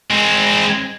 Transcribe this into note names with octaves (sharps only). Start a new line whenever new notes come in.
G#3 C4